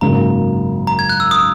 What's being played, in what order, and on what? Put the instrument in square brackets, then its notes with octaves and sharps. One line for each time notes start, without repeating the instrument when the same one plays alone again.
[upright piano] G#1 F#2 C#3 F#3 A#3 [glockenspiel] A#5
[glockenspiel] A#5
G#6
F#6
E6
D#6